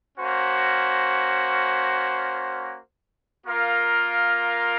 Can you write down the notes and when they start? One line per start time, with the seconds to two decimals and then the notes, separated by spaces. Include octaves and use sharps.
0.18 A#3 C#4 F#4 C5
3.45 A#3 F4 A#4 F5